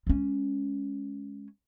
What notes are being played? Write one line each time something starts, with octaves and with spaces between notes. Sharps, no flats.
G#3 C#4